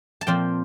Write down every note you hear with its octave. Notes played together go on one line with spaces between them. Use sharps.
A5
A#2 F3 C4 G5